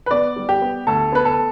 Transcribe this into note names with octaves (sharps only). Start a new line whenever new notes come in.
B4
B3 D5
G3
G4
B3
D2 A4
B3 B4
A4